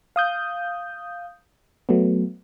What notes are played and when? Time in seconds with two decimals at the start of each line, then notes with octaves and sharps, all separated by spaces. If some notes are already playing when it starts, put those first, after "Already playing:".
0.16 F5 D#6 G6
1.89 F#3 A3 B3